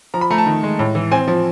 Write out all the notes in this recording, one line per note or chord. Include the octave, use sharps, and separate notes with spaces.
F3 A#5
B5
A3 A#5
A5
D#3
G#3
A2
E3
C4 G#5
F3